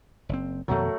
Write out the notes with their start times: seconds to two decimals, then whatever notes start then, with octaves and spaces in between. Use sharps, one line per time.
0.29 F#1 C4
0.68 F2 B2 D#3 F#3 A3